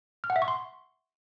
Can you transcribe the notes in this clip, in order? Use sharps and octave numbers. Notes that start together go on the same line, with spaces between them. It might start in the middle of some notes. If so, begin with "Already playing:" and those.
F6
F#5
E5
C#6
C6